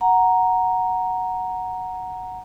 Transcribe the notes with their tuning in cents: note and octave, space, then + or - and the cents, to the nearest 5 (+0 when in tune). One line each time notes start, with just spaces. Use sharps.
F#5 +0 A#5 +0